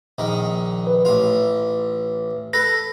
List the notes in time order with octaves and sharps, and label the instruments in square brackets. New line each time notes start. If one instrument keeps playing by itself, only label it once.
[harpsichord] A#1 D#3
[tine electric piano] B4
[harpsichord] A1 F4
[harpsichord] A4 B4 [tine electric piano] A#6